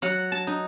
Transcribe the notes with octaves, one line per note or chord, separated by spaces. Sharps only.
F#3 F#5
A5
D#4